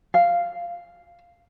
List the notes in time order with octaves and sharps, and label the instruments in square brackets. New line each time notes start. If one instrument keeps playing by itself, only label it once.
[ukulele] F5